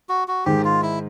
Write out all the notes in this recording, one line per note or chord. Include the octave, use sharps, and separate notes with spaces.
F#4
F#4
G#2 D#3 G#3 G4
F4
E4